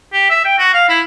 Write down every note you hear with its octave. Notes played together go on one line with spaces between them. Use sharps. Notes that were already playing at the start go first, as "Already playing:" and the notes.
G4
E5
G5
F#4
F5
E4